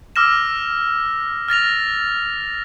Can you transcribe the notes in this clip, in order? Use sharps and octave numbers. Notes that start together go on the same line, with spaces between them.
D6 E6 F6 A#6 E7
F6 A6 A#6 F7